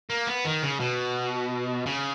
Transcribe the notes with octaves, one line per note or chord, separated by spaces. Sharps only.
A#3
B3
D#3
C#3
B2
C#3